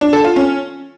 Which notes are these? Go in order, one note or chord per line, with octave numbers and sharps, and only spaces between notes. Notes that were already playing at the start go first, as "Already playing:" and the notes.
D4
A4
F4
C#4